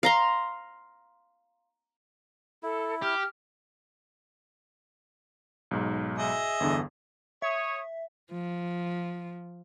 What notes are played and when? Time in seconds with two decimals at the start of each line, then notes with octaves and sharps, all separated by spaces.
0.03 F5 A#5 C6
2.63 E4 A4
3.02 G4 F6
5.71 B1 G#2
6.18 G#4 D#5 E5
6.60 G1 E2 D3
7.42 C#5 E5 D#6
8.31 F3